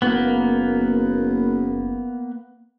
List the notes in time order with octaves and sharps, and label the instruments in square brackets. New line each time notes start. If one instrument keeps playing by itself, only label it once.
[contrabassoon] F#1 [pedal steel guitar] A#3 B3